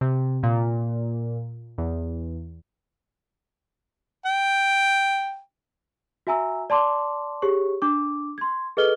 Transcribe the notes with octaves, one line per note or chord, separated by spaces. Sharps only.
C3
A#2
E2
G5
F#4 E5 G#5 A#5 E6
D5 A5 C6 D6
G4 G#4 C#5 C#6
D4 D6
C6 G#6
G#4 A4 B4 D#5 F6 G7